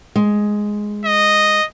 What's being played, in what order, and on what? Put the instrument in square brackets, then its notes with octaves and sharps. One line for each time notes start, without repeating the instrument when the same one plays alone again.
[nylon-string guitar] G#3
[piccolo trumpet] D#5